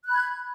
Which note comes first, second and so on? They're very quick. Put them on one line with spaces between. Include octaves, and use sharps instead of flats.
F#6 B5 G#6